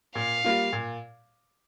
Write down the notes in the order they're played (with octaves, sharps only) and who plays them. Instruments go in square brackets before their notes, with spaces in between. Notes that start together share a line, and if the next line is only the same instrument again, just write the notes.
[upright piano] A#2 [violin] F5
[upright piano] G3 A#3 F4
A#2